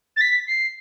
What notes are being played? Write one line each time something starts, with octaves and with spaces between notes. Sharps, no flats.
A6
B6
C7